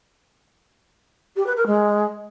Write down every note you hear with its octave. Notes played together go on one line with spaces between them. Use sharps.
G4
B4
A#4
G#3